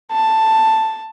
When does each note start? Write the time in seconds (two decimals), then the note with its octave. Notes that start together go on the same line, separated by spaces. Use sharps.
0.12 A5